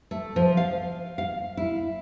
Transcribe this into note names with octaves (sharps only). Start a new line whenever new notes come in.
A3
F3
F5
F5
E4